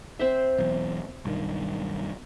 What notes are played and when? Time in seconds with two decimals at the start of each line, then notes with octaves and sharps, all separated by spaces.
0.19 C4 C5 E5
0.58 B1 E2
1.25 B1 G2 D#3